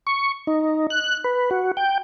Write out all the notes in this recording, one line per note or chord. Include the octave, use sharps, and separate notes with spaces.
C#6
D#4
F#6
B4
F#4
G5